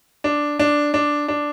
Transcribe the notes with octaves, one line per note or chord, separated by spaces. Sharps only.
D4
D4
D4
D4